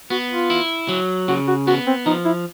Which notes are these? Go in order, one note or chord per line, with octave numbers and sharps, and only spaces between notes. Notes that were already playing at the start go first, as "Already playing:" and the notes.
B3 F#4
F4
E4
F#3
C#3 F#4
F#4
B3 F#4
C4
F3 D#4
E4